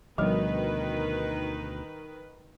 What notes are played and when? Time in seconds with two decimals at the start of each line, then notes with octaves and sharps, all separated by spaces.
0.18 D2 B2 D#3 F3 G3 D#4 B4 D#5